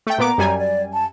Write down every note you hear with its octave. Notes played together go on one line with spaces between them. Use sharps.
A3 G5
A#2 B3 A#5 D6
F#2 G3 G#5
D5
A5